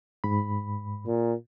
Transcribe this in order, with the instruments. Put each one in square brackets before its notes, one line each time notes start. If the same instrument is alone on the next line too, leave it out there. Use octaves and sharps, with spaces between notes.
[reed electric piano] G#2 B5
[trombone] A#2